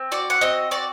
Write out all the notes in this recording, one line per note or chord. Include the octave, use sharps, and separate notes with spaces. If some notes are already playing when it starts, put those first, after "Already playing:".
Already playing: C4
F#4 D5
F#5
C4 D#5
F#4 D5